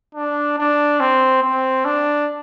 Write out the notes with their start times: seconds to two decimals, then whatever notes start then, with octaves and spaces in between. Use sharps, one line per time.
0.15 D4
0.58 D4
1.00 C4
1.43 C4
1.85 D4